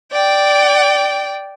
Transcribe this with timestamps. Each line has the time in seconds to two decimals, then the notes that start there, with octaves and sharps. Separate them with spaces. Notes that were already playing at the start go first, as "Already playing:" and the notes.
0.12 D5 G5